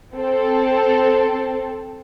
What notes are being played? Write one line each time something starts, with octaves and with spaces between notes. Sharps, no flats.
C4 A4